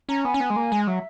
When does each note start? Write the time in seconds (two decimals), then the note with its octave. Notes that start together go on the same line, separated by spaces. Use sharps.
0.09 C#4 A#5
0.24 B3 G#5
0.34 C#4
0.40 B3
0.50 G#3
0.56 A#3
0.72 G#3
0.87 F#3 E5